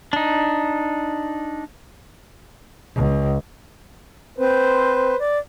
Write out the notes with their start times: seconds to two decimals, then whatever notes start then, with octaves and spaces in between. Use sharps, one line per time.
0.13 D4 D#4
2.95 C#2
4.38 C4 B4 C5
5.19 D5